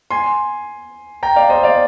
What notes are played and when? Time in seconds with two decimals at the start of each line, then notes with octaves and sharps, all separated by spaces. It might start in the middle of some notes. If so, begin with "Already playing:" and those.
0.10 G#5 C6
1.23 G5 A#5
1.36 D5 F5
1.50 C5 D#5
1.63 D5 F5